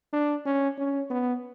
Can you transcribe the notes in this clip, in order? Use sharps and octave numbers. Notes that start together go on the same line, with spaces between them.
D4
C#4
C#4
B3